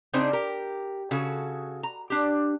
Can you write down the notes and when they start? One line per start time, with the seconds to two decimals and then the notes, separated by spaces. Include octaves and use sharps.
0.13 C#3 C4 D4 D#4 G#4 C5
0.33 G4 A#4
1.11 C#3 F#4 G#4 A4
1.83 A#5
2.10 D4 G4